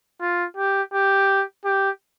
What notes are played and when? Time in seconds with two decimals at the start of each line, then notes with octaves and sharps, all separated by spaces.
0.21 F4
0.56 G4
0.94 G4
1.65 G4